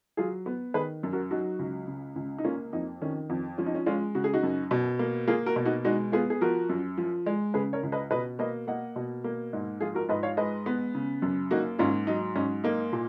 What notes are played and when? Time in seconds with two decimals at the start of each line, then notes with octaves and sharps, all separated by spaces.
0.17 F#3 F4 G#4
0.46 B3
0.74 D#3 G#4 B4
1.03 F#2
1.13 F#4 A#4
1.31 F#3 D#4 F#4
1.59 C#2
1.88 C#3
2.16 C#2
2.38 D#4
2.44 A#3 C#4 F4
2.73 F2 D#4
3.02 D#3 C#4
3.30 F2
3.58 F3 C#4
3.66 D#4
3.75 C#4
3.86 G#3 C#4 F4
4.15 C#3 F#4
4.24 G#4
4.34 D#4 F#4
4.43 F#2
4.71 B2
4.99 A#3
5.27 A#3 F4 G#4
5.46 F#4 A#4
5.56 B2
5.65 D#4 F#4
5.85 G#3 D#4 F#4
6.12 B3 F4 G#4
6.30 G#4
6.41 F3 F#4 A#4
6.69 F#2
6.98 F3
7.26 G#3
7.54 C#3 G#4 B4
7.73 A#4 C#5
7.83 C#2
7.92 B4 D#5
8.11 B2 B4 D#5
8.39 A#3 B4 D#5
8.67 A#3 D#5 F#5
8.96 B2
9.24 A#3
9.53 G#2
9.81 F3 F4 G#4
9.95 F#4 A#4
10.09 G#2 B4 D#5
10.23 C#5 F5
10.37 G#3 B4 D#5
10.66 B3
10.95 C#3
11.22 F#2
11.51 A#3 D#4 F#4
11.79 G#2 C#4 F4
12.07 F#3 D#4
12.36 G#2 C#4
12.64 A#3 D#4
12.93 A#2